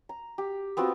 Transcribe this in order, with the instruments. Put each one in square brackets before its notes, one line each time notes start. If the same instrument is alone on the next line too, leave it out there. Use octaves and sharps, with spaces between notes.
[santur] A#5
G4
B3 C4 F4 F#4